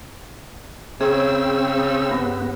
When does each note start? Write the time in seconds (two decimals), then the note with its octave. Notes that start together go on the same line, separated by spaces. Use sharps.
1.01 C#3 C4 G#4 E6
2.11 G2 B3